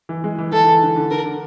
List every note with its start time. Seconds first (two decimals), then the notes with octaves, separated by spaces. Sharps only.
0.09 E3
0.24 G#3
0.38 E3
0.52 E3 A4
0.67 E3
0.82 D3
0.96 D3
1.11 D3 A#4
1.25 D3